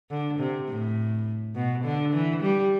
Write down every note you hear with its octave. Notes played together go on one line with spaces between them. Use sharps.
D3
C3
A2
B2
D3
E3
G3